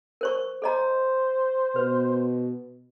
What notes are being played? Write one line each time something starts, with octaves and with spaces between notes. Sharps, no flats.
A#4 C5 C#6
A4 C5 D#5 A#5
B2 B4